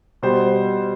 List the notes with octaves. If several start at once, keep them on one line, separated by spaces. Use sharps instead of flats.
B2 G3 C5